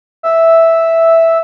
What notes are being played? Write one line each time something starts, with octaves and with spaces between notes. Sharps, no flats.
E5